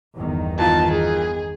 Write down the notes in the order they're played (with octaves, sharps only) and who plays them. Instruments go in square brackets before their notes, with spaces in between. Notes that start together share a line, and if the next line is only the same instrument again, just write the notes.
[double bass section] G1 E2 D#3
[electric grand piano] E3 D#4 F4 [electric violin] A5
[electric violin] G#4